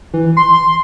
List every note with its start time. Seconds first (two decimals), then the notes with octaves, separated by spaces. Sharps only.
0.13 E3
0.37 C6